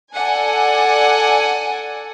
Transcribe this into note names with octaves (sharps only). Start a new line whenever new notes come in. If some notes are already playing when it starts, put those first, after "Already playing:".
A4 D5 F#5 G#5